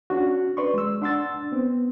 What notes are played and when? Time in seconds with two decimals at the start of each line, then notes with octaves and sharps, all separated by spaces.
0.10 C#4 D4 F#4
0.57 B4 D5 C6 C#6
0.74 G#3 E6
1.02 D4 F#5 C6 E6 A6
1.52 B3 C4